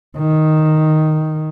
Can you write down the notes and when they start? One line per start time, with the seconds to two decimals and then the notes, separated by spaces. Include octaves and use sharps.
0.17 D#3